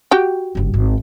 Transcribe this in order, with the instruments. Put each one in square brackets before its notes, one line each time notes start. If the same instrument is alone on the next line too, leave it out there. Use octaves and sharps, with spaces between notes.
[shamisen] F#4 G4 G5
[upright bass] F#1 G2
G#1